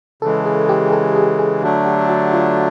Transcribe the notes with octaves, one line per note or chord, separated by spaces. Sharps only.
C#3 E3 G#3 A4
G#4
G4
A4
G#4
G#4
D3 F#3 A3 D4 F#4
G4
F#4
F4